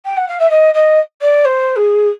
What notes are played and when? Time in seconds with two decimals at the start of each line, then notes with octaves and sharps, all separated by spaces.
0.05 G5
0.16 F#5
0.28 F5
0.39 E5
0.49 D#5
0.74 D#5
1.21 D5
1.45 C5
1.76 G#4